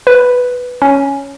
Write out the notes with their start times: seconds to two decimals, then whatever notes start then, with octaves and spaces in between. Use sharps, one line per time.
0.07 B4
0.82 C#4